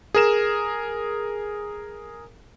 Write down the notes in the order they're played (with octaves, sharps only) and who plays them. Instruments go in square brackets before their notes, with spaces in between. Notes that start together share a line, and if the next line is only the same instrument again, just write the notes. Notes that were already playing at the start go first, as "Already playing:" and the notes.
[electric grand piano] G#4 A#4 E7